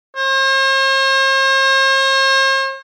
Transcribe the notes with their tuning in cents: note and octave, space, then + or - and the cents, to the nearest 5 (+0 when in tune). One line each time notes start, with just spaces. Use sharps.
C5 +45